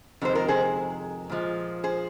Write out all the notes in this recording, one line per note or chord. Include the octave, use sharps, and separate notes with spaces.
F2 C3 D#3 G#3 C5
F4 A#4
G#4 C5
A#2 F3 G#3
G#4 C5